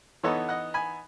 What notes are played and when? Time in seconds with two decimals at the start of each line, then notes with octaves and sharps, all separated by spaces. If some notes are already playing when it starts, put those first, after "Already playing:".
0.23 E3 B3 D#4 A4 C#5
0.49 D#5 F#5
0.74 G#5 B5